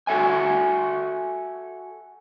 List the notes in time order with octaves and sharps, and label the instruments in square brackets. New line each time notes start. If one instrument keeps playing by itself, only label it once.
[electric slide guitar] F#4 A4 E5 G#5